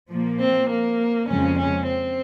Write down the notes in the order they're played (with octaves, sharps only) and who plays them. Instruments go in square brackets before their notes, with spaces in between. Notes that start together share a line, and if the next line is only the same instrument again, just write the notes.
[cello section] A#2 F3 A#3
[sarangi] C4
A#3
[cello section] F2 C#3 G#3 [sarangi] C#4
[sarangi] C#4
C4